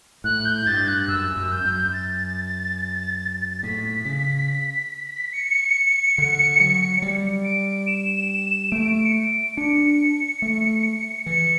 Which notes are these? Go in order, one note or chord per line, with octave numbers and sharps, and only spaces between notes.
A2 F#6
G6
G2 A6
F#6
F#2 E6
F#2
G6
F#2
A6
A2 B6
C#3
C#7
D3
F#3
G3
D7
E7
A3 D7
C#7
D7
D4 C#7
A3
E3 C#7